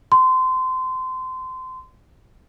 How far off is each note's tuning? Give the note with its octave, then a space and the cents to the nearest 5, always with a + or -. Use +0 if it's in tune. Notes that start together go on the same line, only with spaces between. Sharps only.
C6 -25